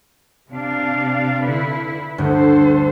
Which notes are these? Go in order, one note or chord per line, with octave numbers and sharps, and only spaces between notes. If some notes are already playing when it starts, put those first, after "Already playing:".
C3 D4 F5
D3 E4 B4
G1 D2 A4 C5